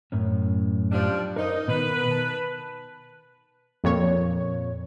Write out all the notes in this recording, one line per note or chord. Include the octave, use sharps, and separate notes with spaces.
F#2 A2 C#4
F3 G3 D4
D#4 A#4 C5
B2 D#3 A#4 B4
A5
F2 A#2 C#5